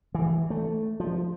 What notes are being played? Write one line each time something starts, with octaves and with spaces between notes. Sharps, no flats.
E3
A3
F3